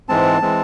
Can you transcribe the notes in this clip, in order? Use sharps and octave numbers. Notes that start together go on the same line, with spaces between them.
G#2 E3 G#3 C4 A5
E3 G#3 C4